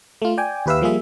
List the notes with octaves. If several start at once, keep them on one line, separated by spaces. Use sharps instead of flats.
A3 F4
D5 G5 G#5
D#2 G4 B4 E5 F5 E6
F3 G3 A#3 F4 G#4 E5